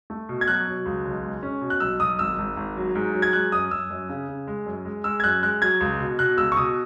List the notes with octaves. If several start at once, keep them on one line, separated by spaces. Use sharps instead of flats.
A3
B2
G#6
F#3 F#6
F#3
C#2
B1
G#3
C#4
B2
F#6
B1 E6
B1 D#6
G#1 E6
G#1
G#1
F#3
G#2
F#3
G#6
G#3 F#6
F#2 D#6
F#2 E6
F#2
C#3
C#3
G#3
F#2
G#3
G#3 E6
G#6
F#2 F#6
G#3 F#6
F#3 G#6
C#2
B2
B2 F#6
C#2 E6
C#6
B2 D#6